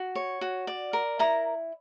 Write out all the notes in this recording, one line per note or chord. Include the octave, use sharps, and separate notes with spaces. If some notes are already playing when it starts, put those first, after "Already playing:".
Already playing: F#4
C#5
F#4
D5
A#4
E4 A#5